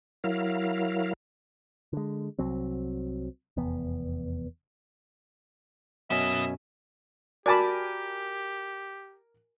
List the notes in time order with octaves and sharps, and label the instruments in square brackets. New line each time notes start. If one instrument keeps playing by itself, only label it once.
[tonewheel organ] F#3 E4 A#4 F5
[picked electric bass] D3 G#3
C2 F#3 C4
F1 E2 B3
[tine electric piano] F#2 B2 C#4 [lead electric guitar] B3 D#5 [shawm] E5
[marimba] F#4 [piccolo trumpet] G4 [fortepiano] A#4 G#5 D6 [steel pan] D5 A5 B5